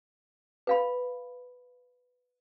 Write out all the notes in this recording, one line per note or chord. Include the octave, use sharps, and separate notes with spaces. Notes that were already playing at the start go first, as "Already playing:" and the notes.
B4 F5 B5